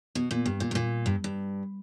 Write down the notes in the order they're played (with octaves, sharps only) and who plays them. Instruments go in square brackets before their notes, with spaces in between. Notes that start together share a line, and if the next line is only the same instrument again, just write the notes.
[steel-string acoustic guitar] B2
A#2
G2
A#2
G2
A#2
G2
G2